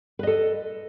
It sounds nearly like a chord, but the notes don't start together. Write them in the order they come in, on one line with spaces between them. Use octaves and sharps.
B4 D#5 A4